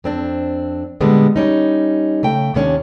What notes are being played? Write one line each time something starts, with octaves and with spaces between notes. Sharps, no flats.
F2 C4 D4
A#2 D3 G3 G#3 B3
G3 C#4 D#4
C#3 A3 G5
D#2 C3 B3 C#4 D4